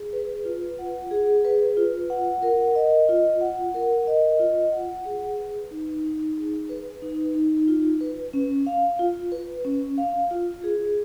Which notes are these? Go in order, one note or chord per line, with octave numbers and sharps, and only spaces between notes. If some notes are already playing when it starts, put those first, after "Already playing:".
Already playing: G#4
B4
F4
F#5
G#4
B4
F4
F#5
A#4
D#5
F4
F#5
A#4
D#5
F4
F#5
G#4
B4
D#4
D#4
G#4
B4
D#4
D#4
F4
B4
C#4
F5
F4
B4
C#4
F5
F4
G#4